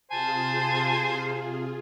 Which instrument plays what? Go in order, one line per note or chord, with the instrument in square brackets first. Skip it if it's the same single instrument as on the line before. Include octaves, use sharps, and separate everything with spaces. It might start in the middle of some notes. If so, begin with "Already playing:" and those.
[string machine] C3 F4 G#4 [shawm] C5 [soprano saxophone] G#5 [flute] A5